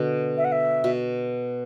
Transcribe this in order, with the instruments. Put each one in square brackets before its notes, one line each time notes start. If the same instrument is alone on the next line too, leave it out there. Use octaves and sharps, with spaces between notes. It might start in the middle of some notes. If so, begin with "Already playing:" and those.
Already playing: [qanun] B2 D3
[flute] E5
F#5
E5
[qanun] B2